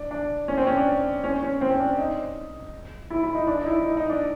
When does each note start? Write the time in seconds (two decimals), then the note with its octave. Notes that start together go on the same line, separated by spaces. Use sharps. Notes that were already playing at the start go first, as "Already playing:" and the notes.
Already playing: D4
0.11 D4
0.48 C#4
0.57 C4
0.67 C#4
0.77 D4
1.24 C#4
1.42 C#4
1.61 C4
1.70 C#4
1.79 D4
1.98 D#4
3.10 E4
3.23 E4
3.35 D#4
3.47 D4
3.62 D#4
3.67 E4
3.84 D#4
3.97 D#4
4.09 D4